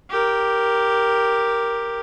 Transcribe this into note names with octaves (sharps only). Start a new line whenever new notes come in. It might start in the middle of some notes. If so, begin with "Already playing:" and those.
G4 A#4